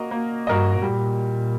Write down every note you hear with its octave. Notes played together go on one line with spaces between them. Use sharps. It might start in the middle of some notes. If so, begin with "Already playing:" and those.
Already playing: A#3 F#4 A#4 D#5
A#3
G2 F#4 A#4 D#5
A#2 G3